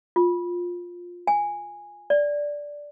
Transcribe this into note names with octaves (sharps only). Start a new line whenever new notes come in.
F4
G#5
D5